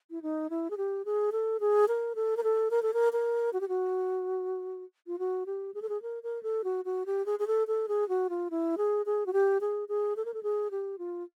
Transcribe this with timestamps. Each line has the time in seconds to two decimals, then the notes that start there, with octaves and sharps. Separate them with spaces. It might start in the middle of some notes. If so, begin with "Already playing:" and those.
0.11 E4
0.22 D#4
0.50 E4
0.70 G#4
0.77 G4
1.05 G#4
1.32 A4
1.60 G#4
1.88 A#4
2.15 A4
2.37 A#4
2.44 A4
2.71 A#4
2.83 A4
2.94 A#4
3.13 A#4
3.53 F#4
3.61 G4
3.69 F#4
5.07 F4
5.19 F#4
5.46 G4
5.74 G#4
5.82 A4
5.89 G#4
6.02 A#4
6.23 A#4
6.43 A4
6.64 F#4
6.85 F#4
7.06 G4
7.26 G#4
7.39 G#4
7.47 A4
7.68 A4
7.88 G#4
8.09 F#4
8.30 F4
8.51 E4
8.78 G#4
9.06 G#4
9.26 F#4
9.33 G4
9.61 G#4
9.89 G#4
10.17 A4
10.25 A#4
10.34 A4
10.43 G#4
10.71 G4
10.99 F4